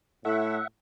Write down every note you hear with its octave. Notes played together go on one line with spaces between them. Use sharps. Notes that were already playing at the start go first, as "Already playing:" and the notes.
A2 A3 E4 E5 F#5